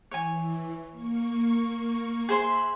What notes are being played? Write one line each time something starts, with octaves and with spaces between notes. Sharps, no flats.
E3 C#5 G#5
A#3 C#6
G#4 C5 E5 B5 C6 F#6